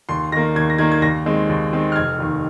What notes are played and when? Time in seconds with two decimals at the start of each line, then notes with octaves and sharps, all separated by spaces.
0.09 D#2 C6
0.32 D#3 A#3 A#6
0.56 D#2 G#6
0.70 A#6
0.78 D#3 A#3 G#6
0.92 G#6
1.02 D#2 A#6
1.26 D#3 G#3 C4
1.49 D#2
1.73 D#3 G#3 C4
1.92 F6
1.96 F1 G#6
2.19 D#2 D#3